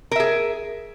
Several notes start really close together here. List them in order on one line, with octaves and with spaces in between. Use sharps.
A#4 E5 G#4